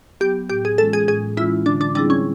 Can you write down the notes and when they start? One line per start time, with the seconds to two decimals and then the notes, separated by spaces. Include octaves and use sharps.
0.20 F#3 B3 G4
0.50 A2 G4
0.65 G#4
0.78 E3 G#3 C#4 F4 A4
0.93 G#4
1.08 A2 G#4
1.37 E3 G#3 C#4 E4 F4
1.66 D3 D4
1.81 D4
1.95 G3 C4 D4 E4 G#4
2.10 C#4